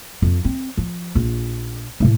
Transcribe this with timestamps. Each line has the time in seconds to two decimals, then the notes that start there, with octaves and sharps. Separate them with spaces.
0.22 F2
0.45 C4
0.77 F3
1.15 A#1 F4
2.00 D#1 A2